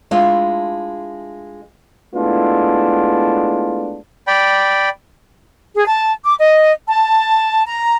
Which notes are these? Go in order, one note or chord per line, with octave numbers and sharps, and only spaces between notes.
G#3 A3 D4 E4 F4
G#3 A3 B3 D4 E4 F4
D5 G5 B5
G#4
A5
D6
D#5
A5
A#5